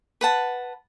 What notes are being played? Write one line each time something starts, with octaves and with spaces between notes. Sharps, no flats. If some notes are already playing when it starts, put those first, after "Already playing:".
B4 F#5 A5